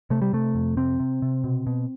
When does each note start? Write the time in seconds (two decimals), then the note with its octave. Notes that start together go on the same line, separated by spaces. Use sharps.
0.10 C3 A3
0.22 G3
0.33 C3 A3
0.55 F2
0.77 C3 C4
0.99 C3
1.22 C3
1.44 B2
1.67 B2